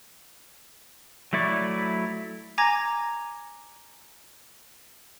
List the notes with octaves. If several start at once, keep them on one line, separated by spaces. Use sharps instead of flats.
F#3 A3 E4 D5 C#6
G#5 A#5 D6 G#6 A#6